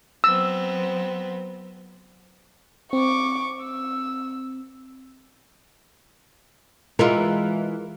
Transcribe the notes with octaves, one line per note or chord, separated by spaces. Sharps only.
F#3 B3 C4 E6
C4 C#6 D6
E6
E3 G#3 F4 A#4